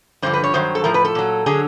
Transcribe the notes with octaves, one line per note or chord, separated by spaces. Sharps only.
G2 D3 F3 C5
B4
C#5
G2 D#3 F#3 C5
A4
A2 F3 A#4
B4
A4
A#2 F#3
D3 F#3 G#4